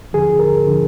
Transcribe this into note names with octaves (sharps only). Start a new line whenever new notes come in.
D#2 D3 F3 G#4
A#4
D3 F3